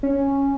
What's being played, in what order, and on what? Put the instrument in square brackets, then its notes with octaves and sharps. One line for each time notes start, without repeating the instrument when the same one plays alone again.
[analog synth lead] C#4